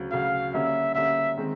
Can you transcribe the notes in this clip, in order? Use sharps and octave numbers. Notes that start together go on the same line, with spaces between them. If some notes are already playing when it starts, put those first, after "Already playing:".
Already playing: D2 C#3 F#3
D2 C#3 F#3 F5
D3 G3 A#3 C#4 E5
D3 G3 A#3 C#4 E5
D#3 G#3 C4